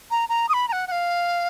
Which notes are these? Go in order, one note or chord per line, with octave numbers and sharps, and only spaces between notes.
A#5
A#5
D#6
B5
A#5
F#5
F#5
F5